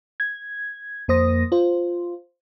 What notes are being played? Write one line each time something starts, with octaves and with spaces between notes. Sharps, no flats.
G#6
F2 A#3 C5 D#6 A#6
F4 C5